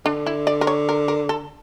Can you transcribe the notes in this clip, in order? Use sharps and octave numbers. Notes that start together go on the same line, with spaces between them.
D3 D4
E4
D5
A#4
C#5
A#4
A#4
A4